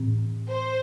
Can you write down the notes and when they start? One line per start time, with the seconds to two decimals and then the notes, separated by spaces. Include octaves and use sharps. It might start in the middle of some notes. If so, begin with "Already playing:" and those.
Already playing: A2 E3 C4
0.50 C5